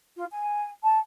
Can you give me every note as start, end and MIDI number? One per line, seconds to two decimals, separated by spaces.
0.16 0.26 65
0.31 0.70 80
0.84 0.97 81